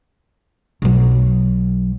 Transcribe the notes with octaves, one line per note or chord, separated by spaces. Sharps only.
B1 F#3